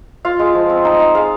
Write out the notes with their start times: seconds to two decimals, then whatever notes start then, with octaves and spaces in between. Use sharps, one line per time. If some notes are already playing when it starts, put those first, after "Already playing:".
0.25 F4 F5
0.39 G#3
0.55 F3
0.70 C4
0.85 D#4
0.99 D#4
1.15 G#3 F5